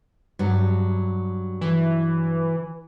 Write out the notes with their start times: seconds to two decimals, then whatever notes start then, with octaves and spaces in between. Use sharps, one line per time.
0.39 G2 F#3
1.61 E3